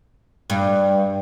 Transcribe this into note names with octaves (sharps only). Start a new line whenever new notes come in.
G2